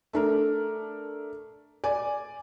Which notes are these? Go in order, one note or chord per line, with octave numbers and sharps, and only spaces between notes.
A3 D4 A#4
D5 G#5